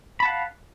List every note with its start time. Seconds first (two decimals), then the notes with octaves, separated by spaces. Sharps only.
0.20 B5
0.23 A5
0.25 F#5
0.28 F5